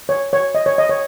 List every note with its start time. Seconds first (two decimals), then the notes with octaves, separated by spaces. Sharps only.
0.09 C#5
0.33 C#5
0.55 D#5
0.66 C#5
0.78 D#5
0.89 C#5